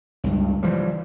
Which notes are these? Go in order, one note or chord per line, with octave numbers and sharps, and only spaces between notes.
C#2 G2
E3 F3 G3